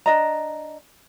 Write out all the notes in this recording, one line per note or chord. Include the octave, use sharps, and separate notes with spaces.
D4 D#5 A#5